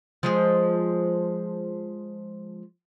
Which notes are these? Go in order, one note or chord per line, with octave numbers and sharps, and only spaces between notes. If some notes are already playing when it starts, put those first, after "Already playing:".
F3 G#3 G#4